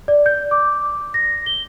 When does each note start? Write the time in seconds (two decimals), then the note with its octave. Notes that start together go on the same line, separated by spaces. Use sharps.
0.08 D5
0.26 G6
0.51 D6
1.14 A#6
1.46 G7